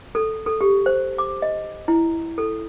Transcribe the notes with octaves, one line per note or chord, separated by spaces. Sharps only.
A4
A4
G4
C5
D6
D#5
E4
A4